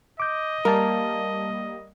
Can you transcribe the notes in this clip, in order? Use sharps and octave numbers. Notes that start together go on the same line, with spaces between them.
D#5 D6 G6
G3 A#3 A#4 F5 A5